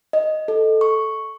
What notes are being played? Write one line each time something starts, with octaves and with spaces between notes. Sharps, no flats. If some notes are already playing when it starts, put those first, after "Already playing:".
D#5
A4
C#6